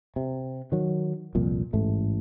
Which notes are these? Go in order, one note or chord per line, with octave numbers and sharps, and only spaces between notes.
C3
D#3 F#3
C2 F2 A#2
A1 G#2 A3